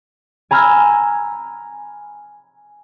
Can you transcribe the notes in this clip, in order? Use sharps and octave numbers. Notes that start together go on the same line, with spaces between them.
G#5 A#5 B5 E6 F6 G#6